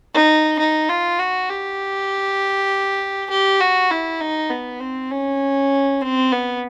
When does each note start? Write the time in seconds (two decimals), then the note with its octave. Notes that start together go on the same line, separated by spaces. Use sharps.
0.14 D#4
0.59 D#4
0.89 F4
1.19 F#4
1.49 G4
3.30 G4
3.61 F#4
3.91 E4
4.21 D#4
4.50 B3
4.80 C4
5.11 C#4
6.01 C4
6.32 B3